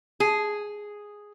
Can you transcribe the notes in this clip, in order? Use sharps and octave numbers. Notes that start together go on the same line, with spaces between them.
G#4